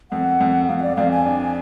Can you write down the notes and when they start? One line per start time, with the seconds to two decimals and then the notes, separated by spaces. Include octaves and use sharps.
0.11 F2 F#5
0.40 F2
0.68 F2 F5
0.78 F5
0.82 D5
0.96 F2 F5
1.11 G#5
1.26 D4